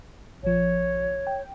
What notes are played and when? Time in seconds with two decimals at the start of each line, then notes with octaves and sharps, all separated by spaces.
0.43 A#1 F3 C#5
1.27 G5